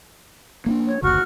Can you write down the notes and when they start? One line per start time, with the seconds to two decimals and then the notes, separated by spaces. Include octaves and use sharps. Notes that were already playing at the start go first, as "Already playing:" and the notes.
0.66 A#3 C4 D4
0.86 C#5
1.02 F#1 D2 F#4 C#6 F6